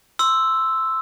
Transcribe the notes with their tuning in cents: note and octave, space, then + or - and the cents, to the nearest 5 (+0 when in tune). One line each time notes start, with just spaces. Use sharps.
C6 +0 E6 +0